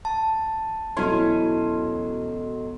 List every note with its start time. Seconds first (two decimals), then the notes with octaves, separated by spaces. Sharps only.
0.05 A5
0.97 E1 F#3 C#4 E4 A4 D#5 C6